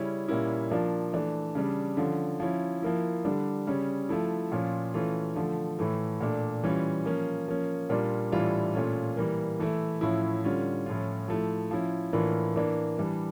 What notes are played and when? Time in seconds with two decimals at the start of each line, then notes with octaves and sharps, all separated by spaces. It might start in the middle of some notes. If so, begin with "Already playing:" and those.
Already playing: C#3 G3 C#4 E4
0.28 A#2 G3 A#3 C#4 E4
0.71 F3 A#3 D4 F4
1.13 E3 A3 D4
1.55 C#3 G3 D4
1.97 D3 F3 C#4
2.40 F3 C#4 E4
2.82 F3 A#3 E4
3.25 D3 G3 D4
3.67 C#3 G3 C#4
4.09 F3 A3 E4
4.52 A#2 F3 C#4 F4
4.94 E3 A3 C#4 F4
5.36 D3 F3 A3
5.79 A2 E3 A3
6.21 A#2 A3 D4
6.64 E3 G3 C#4 F4
7.05 F3 A#3 C#4
7.48 F3 A#3 C#4
7.89 A#2 G3 A#3 D4 F4
8.32 A2 E3 G3 D4 F4
8.75 A#2 A3 C#4 F4
9.17 E3 G3 A#3
9.59 E3 A3 E4
10.01 A2 F3 C#4 E4
10.44 D3 G3 C#4 F4
10.86 A2 F3 C#4 F4
11.28 F3 A3 E4
11.71 F3 C#4 E4
12.13 A2 E3 A#3 D4 F4
12.56 E3 A#3 D4
12.98 E3 G3 D4